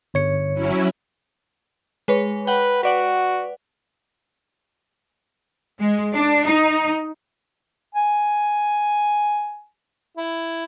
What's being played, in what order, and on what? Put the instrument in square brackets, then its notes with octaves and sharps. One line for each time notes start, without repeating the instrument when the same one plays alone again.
[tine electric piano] G1 C#5 C#7
[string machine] F#3 C#4 E4
[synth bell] G#3 B4 C#5
[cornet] B4 [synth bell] F#5 G5
[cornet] F#4 [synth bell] B4 D5 F#5
[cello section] G#3
D4
D#4
[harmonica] G#5
E4